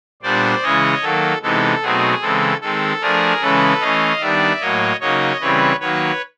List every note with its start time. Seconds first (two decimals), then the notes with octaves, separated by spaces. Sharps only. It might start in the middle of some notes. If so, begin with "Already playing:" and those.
0.23 A#2 G3 B3 D4 C5 D5
0.63 C#3 E3 G#3 C#4 C#5 D#5
1.02 D#3 F#3 A#3 A4
1.43 C3 E3 G#3 B3 D#4 A4
1.82 B2 F#3 A3 C4 D#4 G#4
2.22 C#3 E3 G#3 C4 A4
2.61 D#3 G#3 C4 A4
3.01 F3 A3 D4 G#4 A#4
3.42 C#3 E3 G#3 C#4 A4 B4
3.80 E3 A3 C#4 D#5 F5
4.20 D#3 G3 B3 D4 D5 E5
4.61 A2 F#3 A#3 C#5 D#5
5.00 C#3 F#3 A#3 D#4 C#5 D#5
5.40 C#3 E3 G3 C4 B4 C#5
5.80 D#3 F#3 A#3 B4 C#5